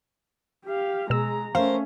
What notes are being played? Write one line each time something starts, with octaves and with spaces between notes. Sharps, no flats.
G4 F5
B2 G#3 A#5 E6
A3 C#4 A#4 C5 F5